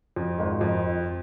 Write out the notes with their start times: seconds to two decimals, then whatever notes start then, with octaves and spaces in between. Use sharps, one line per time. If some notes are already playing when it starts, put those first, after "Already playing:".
0.16 F2
0.38 G#1 G#2
0.61 F2